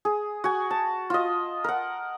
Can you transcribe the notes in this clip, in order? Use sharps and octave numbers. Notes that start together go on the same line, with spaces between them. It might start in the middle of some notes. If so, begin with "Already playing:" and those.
G#4
F#4 G#5
A5
F4 D#5
A#4 F#5